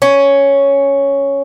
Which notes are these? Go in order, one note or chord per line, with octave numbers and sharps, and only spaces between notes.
C#4